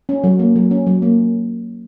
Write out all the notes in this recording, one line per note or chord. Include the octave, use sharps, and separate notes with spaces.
C#4
F#3
A#3
F#3
C#4
F#3
A#3